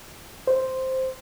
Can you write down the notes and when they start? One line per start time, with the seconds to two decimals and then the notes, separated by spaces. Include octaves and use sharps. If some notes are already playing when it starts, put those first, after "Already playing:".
0.47 C5